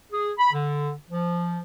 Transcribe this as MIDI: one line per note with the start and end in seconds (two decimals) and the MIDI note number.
0.13 0.30 68
0.39 0.53 83
0.53 0.92 50
1.10 1.59 53